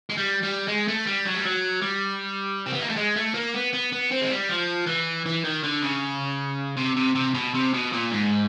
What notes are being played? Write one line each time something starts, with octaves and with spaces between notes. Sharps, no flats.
G#3
G3
G3
G#3
A3
G3
F#3
G3
F#3
G3
C4
B3
A#3
A3
G#3
A3
A#3
B3
B3
B3
C4
G#3
G3
F3
E3
E3
D#3
D3
C#3
C3
C3
C3
B2
C3
B2
A#2
G#2